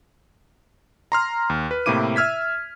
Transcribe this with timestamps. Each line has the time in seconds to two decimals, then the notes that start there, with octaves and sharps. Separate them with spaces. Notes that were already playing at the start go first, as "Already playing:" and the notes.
1.12 A#5 C6 F6
1.50 D#2
1.71 B4
1.86 A2 C3 A#3 E4 D6 D#7
2.16 E5 E6 F6 G#6 B6